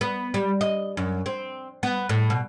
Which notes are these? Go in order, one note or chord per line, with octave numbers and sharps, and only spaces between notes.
B3
G3
D#5
F#2
C4
B3
A2
B2